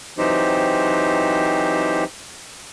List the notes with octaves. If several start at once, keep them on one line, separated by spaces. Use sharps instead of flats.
E3 F#3 C4 D#4 G4 C5